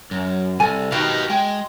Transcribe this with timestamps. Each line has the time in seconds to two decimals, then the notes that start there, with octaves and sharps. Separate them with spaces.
0.11 F#2
0.60 C2 A4 G#5
0.92 B2 D#3 D#4 G4 F5
1.30 G#3 G5